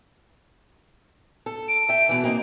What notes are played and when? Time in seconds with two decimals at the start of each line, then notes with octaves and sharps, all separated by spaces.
1.46 A4
1.69 D7
1.89 E5 G5
2.09 B2 E3
2.24 A#3 C4 D#4